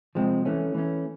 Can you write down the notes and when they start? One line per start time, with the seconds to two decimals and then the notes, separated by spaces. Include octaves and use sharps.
0.15 C3 F3 G#3 C4
0.45 E3 A3 C#4
0.74 E3 A3 C#4